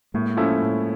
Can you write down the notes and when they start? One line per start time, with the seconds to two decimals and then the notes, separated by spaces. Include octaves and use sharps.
0.14 A2 G#3 A#3
0.37 F3 A3 C#4 E4
0.61 A2